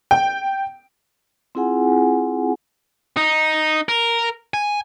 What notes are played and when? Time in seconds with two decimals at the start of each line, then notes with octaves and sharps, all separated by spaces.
0.11 G5
1.55 C4 E4 F4 G#4 F#5 G#5
3.17 D#4
3.89 A#4
4.54 G#5